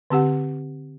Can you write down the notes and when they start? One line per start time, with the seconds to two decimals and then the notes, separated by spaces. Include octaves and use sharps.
0.10 D3 C4 G4 F#5